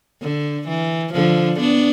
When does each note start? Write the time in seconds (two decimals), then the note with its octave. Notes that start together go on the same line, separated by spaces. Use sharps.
0.22 D3
0.68 E3
1.14 D3 F3
1.60 B3 D4